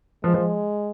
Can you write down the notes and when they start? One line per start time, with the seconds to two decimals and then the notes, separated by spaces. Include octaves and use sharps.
0.24 F3 G#3
0.34 F3